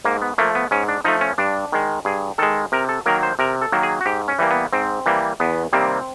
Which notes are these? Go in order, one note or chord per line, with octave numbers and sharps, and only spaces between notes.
G#2 A#3
B3
F3 A3 A#3
B3
G#2 C#4
D4
F3 A3 D#4
C#4
G2 D4
D#3 G#3
G2 G#4
D#3 G#3 A4
C3 A#4
A4
D#3 F#3 A#3 A#4
C5
C3 A#4
A4
D#3 F#3 A#3
G#4
F#4
G#2 G4
C#4
E3 G3 A#3
B3
G#2 C4
E3 G3 A#3
E2 B3
C3 D#3 G3 A#3 C4